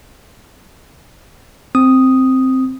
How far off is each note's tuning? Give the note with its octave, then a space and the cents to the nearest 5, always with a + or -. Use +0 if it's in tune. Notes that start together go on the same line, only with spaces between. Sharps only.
C4 +0 D#6 +0